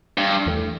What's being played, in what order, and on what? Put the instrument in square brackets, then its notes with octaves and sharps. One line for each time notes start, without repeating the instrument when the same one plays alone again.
[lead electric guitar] G2
[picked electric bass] E2 E3 A3